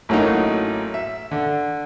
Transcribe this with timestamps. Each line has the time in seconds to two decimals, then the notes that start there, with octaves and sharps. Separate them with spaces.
0.09 A1 A2 F#3 A3 A#3 D#4
0.94 E5
1.31 D3